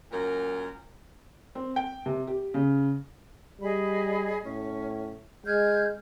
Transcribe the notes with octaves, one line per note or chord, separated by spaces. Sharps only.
F#2 A#2 A#4
C4
G5
C3
G4
C#3
G3 G#4 D#5 B5
A2 C#4
G#3 F6 G6 G#6